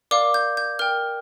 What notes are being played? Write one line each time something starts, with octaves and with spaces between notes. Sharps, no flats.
A#4 D5 F5 D6
G6
G6
A#4 G5 F6